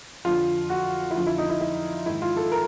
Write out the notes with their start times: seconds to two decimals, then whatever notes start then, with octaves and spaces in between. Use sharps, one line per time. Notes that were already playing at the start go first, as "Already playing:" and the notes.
0.25 F2 D3 F3 F4
0.70 F#4
1.11 E4
1.15 F2 D3 F3 F4
1.27 E4
1.38 D#4
1.49 E4
1.61 E4
2.06 G#2 D#3 E4
2.22 F4
2.37 A4
2.52 A#4